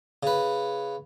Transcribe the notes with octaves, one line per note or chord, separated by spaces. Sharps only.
C#3 B4